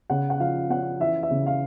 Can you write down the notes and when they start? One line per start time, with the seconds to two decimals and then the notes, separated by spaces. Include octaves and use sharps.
0.10 C#3 F#5
0.30 F#5
0.40 F3 F5
0.70 C#4 F#5
1.00 E3 E5
1.23 E5
1.31 C#3
1.46 F5